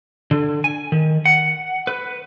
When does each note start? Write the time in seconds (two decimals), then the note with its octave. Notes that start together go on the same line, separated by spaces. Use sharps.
0.31 D3
0.64 G#5
0.92 D#3
1.26 F#5
1.87 B4